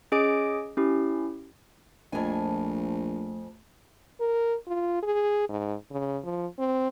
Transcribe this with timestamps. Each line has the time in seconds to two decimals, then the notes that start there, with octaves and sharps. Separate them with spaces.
0.12 C#4 G#4 D#5 G#5 D6 D7
0.77 C#4 E4 G4
2.12 A#1 F2 A3 G#5
4.20 A#4
4.67 F4
5.03 G#4
5.49 G#2
5.91 C#3
6.24 F3
6.59 C4